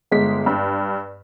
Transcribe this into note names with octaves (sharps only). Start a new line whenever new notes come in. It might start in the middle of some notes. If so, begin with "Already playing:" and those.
G1 G#3 B6
G2